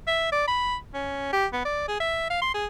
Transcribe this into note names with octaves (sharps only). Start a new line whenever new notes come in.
E5
D5
B5
C#4
G4
B3
D5
G#4
E5
F5
C6
G#4